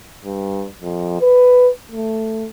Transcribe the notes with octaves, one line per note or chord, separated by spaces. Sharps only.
G2
F2
B4
A3